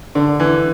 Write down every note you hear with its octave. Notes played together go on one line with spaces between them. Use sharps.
D3
E3